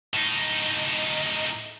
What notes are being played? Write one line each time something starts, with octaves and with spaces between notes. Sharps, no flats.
A2 D#4